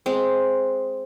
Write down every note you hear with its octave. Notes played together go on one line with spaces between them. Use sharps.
G#3 C4